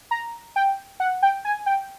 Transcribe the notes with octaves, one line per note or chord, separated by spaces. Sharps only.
A#5
G5
F#5
G5
G#5
G5